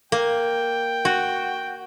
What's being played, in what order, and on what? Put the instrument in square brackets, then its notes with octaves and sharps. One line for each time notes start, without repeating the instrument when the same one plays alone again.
[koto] A#3 [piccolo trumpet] G5
[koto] F#4